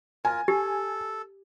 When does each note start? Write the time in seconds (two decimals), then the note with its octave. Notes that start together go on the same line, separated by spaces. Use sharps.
0.25 F4 A#4 G#5
0.48 G4 A4